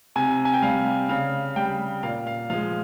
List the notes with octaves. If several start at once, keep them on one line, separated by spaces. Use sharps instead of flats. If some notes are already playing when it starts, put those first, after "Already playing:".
C3 G#5
G#5
G5
G3 F5
C#3 F5
G3 G5
A#2 F5
F5
F3 G#3 F5